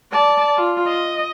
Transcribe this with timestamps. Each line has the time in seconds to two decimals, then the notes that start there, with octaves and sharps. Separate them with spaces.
0.12 D5 A5
0.57 F4
0.87 D#5